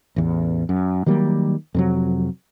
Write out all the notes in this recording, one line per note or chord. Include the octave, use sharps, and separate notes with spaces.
A1 E2
F#2
D#3 F#3 G3 A#3
F2 C3 F#3